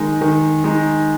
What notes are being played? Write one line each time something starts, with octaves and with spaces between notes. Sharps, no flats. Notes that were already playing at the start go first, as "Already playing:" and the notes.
Already playing: D#3 G#3 D#4
D#3
G#3 D#4